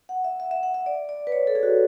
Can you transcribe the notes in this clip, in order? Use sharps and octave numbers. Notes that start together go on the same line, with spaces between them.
F#5
E5
E5
E5
F#5
E5
D5
D5
B4
C#5
A4
G#4
F#4